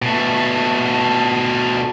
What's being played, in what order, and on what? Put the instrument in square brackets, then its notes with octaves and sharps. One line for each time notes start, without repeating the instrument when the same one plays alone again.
[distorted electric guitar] B2 A3